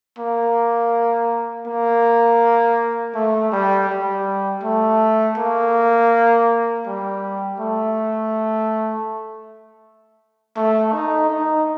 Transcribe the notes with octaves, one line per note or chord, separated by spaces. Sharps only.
A#3
A#3
A3
G3
G3
A3
A#3
G3
A3
A3
D#4
D#4